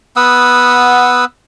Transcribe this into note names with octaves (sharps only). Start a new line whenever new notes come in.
B3 F#5 D#6 E6